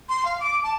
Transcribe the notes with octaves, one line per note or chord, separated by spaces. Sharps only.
C6
F5
D6
A5